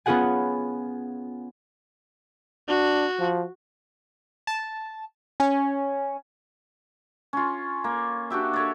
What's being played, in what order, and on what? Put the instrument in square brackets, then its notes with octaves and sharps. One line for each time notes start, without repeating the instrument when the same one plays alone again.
[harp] B3 C#4 F4 G#4 F#5 G#5
[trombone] D4 [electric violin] F#4
[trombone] F3
[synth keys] A5
[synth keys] C#4 [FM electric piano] G#5
[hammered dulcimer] C#4 F4
A#3
D4 F#4 G4 E5
A4 C#5 D5